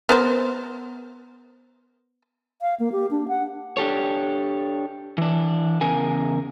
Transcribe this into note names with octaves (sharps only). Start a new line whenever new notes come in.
B3 A#4 C5
F5
A#3
G4
D4
F#5
D4 G4 A4 C#5
E3 D4
E2 C#3 A#4 G#5